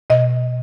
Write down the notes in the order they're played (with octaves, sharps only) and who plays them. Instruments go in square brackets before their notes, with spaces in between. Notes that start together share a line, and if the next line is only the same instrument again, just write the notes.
[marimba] B2 D#5